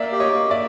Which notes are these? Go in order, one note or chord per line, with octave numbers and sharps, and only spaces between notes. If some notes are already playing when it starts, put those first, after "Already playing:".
Already playing: A#3 D5 E5
G4
C#5 D#5
A#3
D5 E5